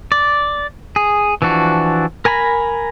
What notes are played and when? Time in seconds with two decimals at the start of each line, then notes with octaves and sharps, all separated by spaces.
0.12 D5
0.96 G#4
1.42 E3 F3 D4 F#4
2.25 A#4 G#5 A#5 B5